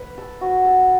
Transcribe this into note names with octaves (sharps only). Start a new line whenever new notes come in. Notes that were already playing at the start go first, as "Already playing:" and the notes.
Already playing: B4
A4
F#4
A4